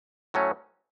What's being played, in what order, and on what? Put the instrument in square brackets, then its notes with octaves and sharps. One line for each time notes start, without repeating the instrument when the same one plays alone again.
[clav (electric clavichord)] A2 F#3 A3 C#4